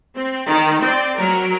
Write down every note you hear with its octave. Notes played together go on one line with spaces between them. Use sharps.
C4
D#3
C4 D5
F#3 A#4